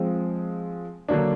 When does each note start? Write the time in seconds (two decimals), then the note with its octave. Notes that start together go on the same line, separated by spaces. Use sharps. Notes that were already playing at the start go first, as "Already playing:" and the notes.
Already playing: F3 G#3 C4
1.09 D3 F#3 A#3 D4